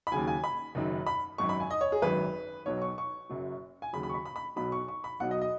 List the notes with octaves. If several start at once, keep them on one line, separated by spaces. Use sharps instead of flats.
B5
D#2 C#3 F#3 G#5
G#5
B5
F#1 F#2 D#3 F#3
B5
G#1 F#2 D#3 F#3 C#6
B5
G#5
D#5
C#5
G#4
G#1 F#2 F#3 B4
B1 B2 F#3 C#5
C#6
C#6
F#1 F#2 F#3
G#5
D#2 C#3 F#3 B5
B5
C#6
B5
B5
B5
B1 B2 F#3 B5
C#6
C#6
B5
B1 B2 F#3 F#5
D#5
D#5